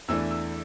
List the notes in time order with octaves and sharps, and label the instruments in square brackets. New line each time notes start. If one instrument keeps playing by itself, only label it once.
[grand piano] E2 E3 A3 D4 E6
E6